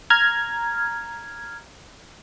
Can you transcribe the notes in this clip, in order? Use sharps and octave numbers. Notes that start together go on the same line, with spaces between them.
A#5 F6 G#6